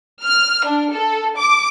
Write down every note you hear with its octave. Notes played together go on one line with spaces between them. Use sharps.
F6
D4
A4
D6